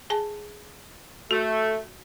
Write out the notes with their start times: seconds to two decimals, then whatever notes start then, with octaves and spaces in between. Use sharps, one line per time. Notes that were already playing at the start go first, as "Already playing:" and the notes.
0.10 G#4 G#5 A5
1.31 A3 F#4